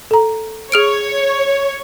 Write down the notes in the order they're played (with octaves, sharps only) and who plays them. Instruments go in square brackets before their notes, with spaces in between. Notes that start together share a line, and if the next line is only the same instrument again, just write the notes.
[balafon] A4 A#5
[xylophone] G#4 F6 D7 [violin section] C#5